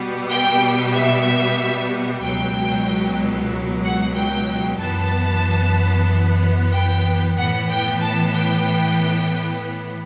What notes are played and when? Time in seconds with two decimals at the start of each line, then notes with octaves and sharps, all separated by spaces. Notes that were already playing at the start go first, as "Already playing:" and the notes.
Already playing: B2 G3 B3
0.29 G5
0.93 E5
2.22 C#2 B2 F#3 G5
3.83 F#5
4.16 G5
4.79 F#2 E3 B3 A5
6.72 G5
7.37 A2 E3 B3 F#5
7.68 G5
8.01 A5
8.34 G5